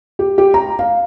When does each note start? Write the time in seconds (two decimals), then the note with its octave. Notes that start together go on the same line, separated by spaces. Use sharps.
0.19 G4
0.38 G4
0.54 A#5
0.79 F5